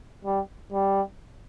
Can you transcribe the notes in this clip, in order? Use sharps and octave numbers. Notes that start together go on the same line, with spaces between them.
G3
G3